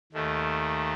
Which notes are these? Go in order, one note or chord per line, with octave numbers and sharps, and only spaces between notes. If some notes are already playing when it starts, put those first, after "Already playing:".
D#2 D#3 A3